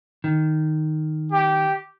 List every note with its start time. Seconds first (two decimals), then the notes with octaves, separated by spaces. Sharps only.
0.24 D#3
1.31 G4